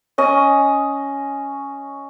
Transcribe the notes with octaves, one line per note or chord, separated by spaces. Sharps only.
C#4 D#5